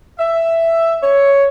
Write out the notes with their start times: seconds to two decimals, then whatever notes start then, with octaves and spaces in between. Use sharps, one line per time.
0.19 E5
1.02 C#5